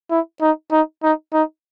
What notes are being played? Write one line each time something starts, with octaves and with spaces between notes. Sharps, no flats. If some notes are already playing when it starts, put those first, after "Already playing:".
E4
D#4
D#4
D#4
D#4